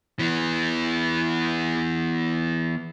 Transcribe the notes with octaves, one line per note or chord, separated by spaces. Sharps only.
E3 B3